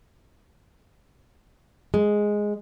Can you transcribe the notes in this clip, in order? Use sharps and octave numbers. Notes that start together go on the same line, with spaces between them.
G#3